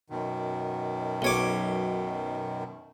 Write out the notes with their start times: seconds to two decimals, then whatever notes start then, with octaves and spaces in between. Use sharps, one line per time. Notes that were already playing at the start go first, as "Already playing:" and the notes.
0.10 F#2 B2 D#3
1.22 B1 C#5 D6